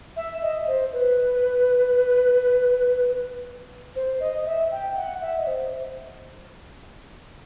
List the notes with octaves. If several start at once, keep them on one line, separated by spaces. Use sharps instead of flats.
E5
D#5
C5
B4
C5
D#5
E5
G5
F#5
E5
D#5
C5